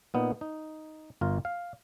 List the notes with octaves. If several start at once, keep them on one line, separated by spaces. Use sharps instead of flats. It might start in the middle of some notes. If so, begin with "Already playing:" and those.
A#2 B3 D#4
D#4
G1 F4 A#4
F5